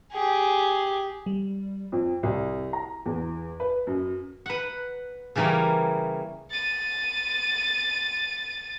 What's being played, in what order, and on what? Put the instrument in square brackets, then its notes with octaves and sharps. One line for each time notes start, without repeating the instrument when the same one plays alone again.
[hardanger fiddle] G4 G#4
[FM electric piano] G3
[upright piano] F2
C2
A#5
E2
B4
F#2
[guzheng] B4 F#5
C#3 E3 G3 A#3 C#4
[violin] A6 D#7